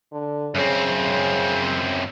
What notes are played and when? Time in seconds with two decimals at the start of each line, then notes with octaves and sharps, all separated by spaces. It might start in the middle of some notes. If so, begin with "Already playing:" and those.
0.12 D3
0.56 F#2 C#3 C4